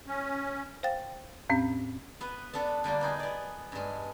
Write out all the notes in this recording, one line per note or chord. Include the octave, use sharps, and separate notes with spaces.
C#4
C5 F5 G5 A6
E2 A2 C4 C#4
B3 B4
B3 D4 A4
D3 G3 A#3 D4
B3 D#4 G#4
B3 D5
G2 G#3